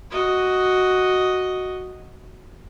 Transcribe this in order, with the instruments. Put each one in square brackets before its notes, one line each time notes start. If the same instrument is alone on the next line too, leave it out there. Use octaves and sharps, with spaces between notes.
[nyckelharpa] F#4 D#5